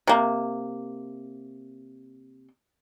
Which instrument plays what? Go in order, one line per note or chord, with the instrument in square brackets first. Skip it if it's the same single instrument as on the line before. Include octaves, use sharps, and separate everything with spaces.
[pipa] C3 A#3